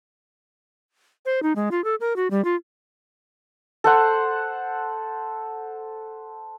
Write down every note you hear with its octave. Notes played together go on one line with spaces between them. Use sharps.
C5
D#4
G#3
F4
A4
A#4
F#4
G3
F4
A4 C5 F#5